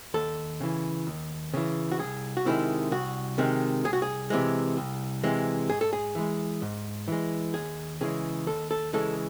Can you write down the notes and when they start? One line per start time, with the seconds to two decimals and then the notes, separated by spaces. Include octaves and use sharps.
0.14 D#2 A4
0.60 C#3 E3
1.07 D#2
1.54 C#3 E3
1.92 F#4
1.99 C2 G#4
2.37 F#4
2.45 C3 D#3 G#3 E4
2.91 C2 F#4
3.38 C3 D#3 G#3
3.84 C2 G#4
3.93 F#4
4.02 G#4
4.30 C3 E3 G#3
4.77 C2
5.24 C3 E3 G#3
5.69 G#2 G#4
5.81 A4
5.93 G#4
6.15 E3 G#3
6.62 G#2
7.08 E3 G#3
7.54 D#2 G#4
8.01 C#3 E3 G#3 G#4
8.47 D#2 A4
8.71 A4
8.93 C#3 E3 G#3 A4